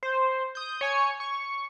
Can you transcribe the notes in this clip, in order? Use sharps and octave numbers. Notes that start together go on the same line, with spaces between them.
C5
D#6 G6
C#5 G#5 C#7
C#6